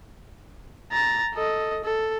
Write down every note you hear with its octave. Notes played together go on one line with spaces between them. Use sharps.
A#5 A6
A4 D#5
A4